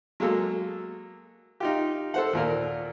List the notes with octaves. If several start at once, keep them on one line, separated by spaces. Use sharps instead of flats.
F#3 G#3 A#3 A4 E6
D#4 F4 G4
A4 C5 F#5
D#2 A#2 A#4